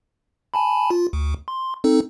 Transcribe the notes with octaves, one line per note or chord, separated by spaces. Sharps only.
G#5 A5 B5
F4
D2
C6
C4 D#4 A4